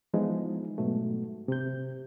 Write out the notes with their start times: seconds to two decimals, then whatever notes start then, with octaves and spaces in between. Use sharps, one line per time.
0.14 E3 F3 G#3 B3 D#4
0.78 G#2 B2 F#3 A3
1.48 C3 G6